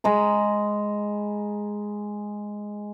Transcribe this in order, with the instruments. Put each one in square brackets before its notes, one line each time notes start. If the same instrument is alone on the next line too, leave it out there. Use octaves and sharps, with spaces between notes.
[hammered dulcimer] G#3 A#5 B5